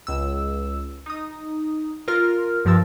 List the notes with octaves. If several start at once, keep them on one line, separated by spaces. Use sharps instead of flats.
C#2 E6
D#4 D#6
F4 A#4 F6
G2 F3 A#4 E6 A6